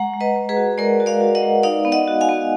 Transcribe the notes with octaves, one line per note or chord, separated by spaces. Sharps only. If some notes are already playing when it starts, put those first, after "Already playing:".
Already playing: G#3 F#5 A#5
G#3
B4 D#5
G#3
G#4 B4
F#4
G#3 A#4 D5
F#4
D5 F5
F#4
D#5 F#5
G#3
D#4 D5 F5
B3
D#5 F#5
F#4
F5 G#5
B3